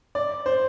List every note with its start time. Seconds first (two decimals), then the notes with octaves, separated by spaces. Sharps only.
0.15 D5
0.46 C5